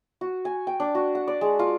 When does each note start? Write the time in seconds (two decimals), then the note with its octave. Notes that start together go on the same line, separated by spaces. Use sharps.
0.21 F#4
0.45 G#5
0.67 G5
0.80 D4
0.95 F#4
1.15 F#5
1.28 D5
1.41 G#3
1.59 F4